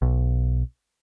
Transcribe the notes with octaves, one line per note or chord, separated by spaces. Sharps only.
B1